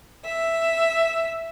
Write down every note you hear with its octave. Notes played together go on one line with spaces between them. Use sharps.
E5